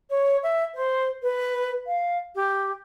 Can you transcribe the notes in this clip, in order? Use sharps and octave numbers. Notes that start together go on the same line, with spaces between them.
C#5
E5
C5
B4
F5
G4